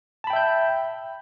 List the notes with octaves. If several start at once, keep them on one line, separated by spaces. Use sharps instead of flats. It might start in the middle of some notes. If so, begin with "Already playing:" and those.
E5 G5 A5 B5 G6